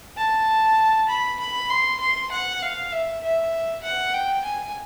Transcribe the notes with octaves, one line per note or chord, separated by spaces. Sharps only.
A5
B5
B5
C6
C6
F#5
F5
E5
E5
F#5
G5
G#5